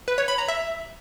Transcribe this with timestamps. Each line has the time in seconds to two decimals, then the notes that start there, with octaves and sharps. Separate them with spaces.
0.08 B4
0.18 C#5
0.28 B5
0.38 A#5
0.48 E5